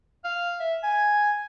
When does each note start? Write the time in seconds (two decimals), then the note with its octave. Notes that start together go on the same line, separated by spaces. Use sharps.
0.25 F5
0.60 E5
0.83 G#5